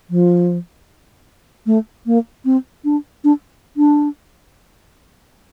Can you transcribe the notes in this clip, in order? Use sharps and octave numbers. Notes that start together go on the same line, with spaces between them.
F3
A3
A#3
C4
D4
D4
D4